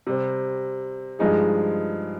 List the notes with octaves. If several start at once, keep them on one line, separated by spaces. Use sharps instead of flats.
C3 G3 C4
G2 F3 G#3 D#4 G#4